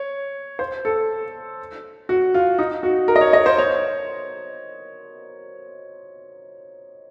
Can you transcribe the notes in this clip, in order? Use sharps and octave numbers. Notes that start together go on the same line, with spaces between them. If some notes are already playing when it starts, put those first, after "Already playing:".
Already playing: C#5
C5
A4
F#4
F4
D#4
F#4
A#4
D#5
C#5
D#5
C5
C#5